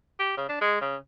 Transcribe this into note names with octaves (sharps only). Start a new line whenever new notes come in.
G4
C#3
D4
G#3
C#3